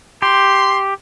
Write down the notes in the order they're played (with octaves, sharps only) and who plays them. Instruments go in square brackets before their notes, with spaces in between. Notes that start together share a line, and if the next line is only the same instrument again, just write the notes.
[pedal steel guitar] G4 [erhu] C6